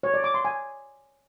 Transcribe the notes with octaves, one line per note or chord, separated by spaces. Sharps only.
C#5
D5
D6
C6
G#5